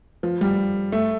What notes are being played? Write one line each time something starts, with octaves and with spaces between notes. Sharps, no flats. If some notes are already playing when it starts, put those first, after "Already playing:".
F3
G3
A3